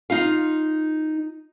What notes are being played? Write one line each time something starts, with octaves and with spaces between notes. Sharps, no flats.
D#4 F4 F5